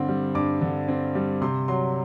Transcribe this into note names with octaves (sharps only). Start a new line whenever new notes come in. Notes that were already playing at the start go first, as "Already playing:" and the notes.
Already playing: G2 D3 C4
G3
G2 D6
D3
C4
G3
C3 C6
F#3 C6